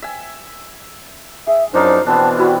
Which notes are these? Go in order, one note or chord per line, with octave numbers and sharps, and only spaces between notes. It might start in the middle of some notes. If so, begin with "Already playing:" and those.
E5 G#5
G#4 E5
F#2 F3 A#3 D4 D#4 C5 F5
B2 E3 B3 C4 D4 A5
G3 E4 F#4